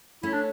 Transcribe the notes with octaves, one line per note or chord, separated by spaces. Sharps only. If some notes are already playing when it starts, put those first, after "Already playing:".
A3 C#4 E4
D4